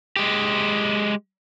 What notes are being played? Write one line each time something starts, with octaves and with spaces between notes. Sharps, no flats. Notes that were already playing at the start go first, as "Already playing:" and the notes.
G#3 G4